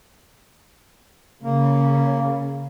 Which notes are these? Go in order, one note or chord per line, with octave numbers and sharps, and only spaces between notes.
C#3 A#3